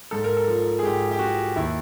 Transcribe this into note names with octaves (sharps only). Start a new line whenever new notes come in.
G#2 A4
A#4
A4
F3
G#4
G#2 G4
G4
F3 F#4
D#2 E4